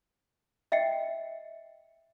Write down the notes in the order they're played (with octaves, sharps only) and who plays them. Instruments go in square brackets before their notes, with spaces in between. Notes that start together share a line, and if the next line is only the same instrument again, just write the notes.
[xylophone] D#5 E5 G5 C7 C#7